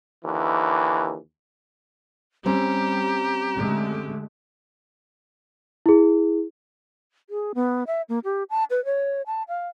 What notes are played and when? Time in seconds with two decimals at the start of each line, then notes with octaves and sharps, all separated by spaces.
0.25 D#2 D3 E3
2.46 G3 C4 C#4 G4 A#5
3.57 D3 G#3 A3
5.86 E4 G#4
7.30 G#4
7.55 B3
7.87 E5
8.09 A#3
8.24 G4
8.50 A5
8.70 B4
8.85 C#5
9.26 A5
9.48 F5